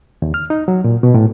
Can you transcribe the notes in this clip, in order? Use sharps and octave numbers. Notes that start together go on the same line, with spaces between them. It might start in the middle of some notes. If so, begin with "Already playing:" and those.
D#2
F6
D#4
F#3
A#2
B2
A2